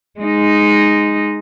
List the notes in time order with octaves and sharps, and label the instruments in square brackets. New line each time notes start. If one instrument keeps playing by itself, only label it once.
[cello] G#3 D#4